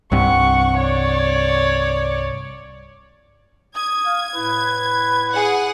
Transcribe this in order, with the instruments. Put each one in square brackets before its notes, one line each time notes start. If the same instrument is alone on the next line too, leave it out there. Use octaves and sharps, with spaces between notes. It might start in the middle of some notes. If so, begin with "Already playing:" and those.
[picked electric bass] C2 G2 C3 [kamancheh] F#5 C#6
[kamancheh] C#5 D5
[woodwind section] D#6 [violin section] G#6
[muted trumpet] F5
[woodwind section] A2 E4 [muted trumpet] B4
[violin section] G#4 F#5